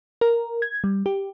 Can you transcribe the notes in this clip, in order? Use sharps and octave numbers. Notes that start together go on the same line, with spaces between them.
A#4
G#6
G3
G4